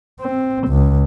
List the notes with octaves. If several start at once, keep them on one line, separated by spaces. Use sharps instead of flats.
C4
C#2